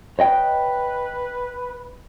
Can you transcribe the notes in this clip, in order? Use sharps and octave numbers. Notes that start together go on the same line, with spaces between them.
B4 C#5 D#5 G5